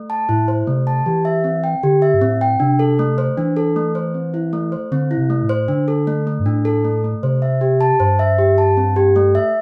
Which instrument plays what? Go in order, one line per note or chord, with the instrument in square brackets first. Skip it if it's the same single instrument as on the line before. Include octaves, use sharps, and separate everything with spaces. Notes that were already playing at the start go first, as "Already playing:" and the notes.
Already playing: [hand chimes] A3
A5
[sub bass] A2 [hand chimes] E4
[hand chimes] C5
[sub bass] C3 [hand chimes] A3
[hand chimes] A5
[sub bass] E3 [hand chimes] G4
[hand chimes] E5
C4
G5
[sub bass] D3 [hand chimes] G4
[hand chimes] E5
[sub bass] G2
[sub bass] A2 [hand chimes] C4
[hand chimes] G5
[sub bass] C3 [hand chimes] D4
[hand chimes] A4
A3
C5
[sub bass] E3 [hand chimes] D4
[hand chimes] A4
A3
C5
C4
E4
A3
C5
[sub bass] D3 [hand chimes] C4
[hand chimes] E4
[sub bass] C3
[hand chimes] A3
[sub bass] A2
[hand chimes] C5
[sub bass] D3 [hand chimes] D4
[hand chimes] A4
A3
A3
[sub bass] G2
[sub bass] A2 [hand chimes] D4
[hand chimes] A4
A3
A3
[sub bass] C3 [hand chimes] C5
[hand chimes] E5
G4
A5
[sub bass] G2 [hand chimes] C5
[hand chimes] E5
G4
A5
C4
G4
A3
E5